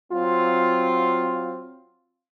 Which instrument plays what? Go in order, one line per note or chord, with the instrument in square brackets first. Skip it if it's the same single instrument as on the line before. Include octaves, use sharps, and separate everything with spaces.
[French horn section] F#3 C4 F4